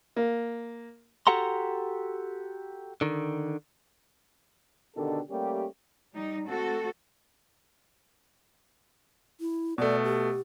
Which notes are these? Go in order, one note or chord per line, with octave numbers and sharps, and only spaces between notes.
A#3
F#4 G4 A4 F#5 A#5 C6
D3 D#3
B2 D3 D#3 D4 G4 A4
G3 A3 A#3 C#4 G4
G3 D#4
A3 C4 F#4 A4
E4
B2 A3 D5
G4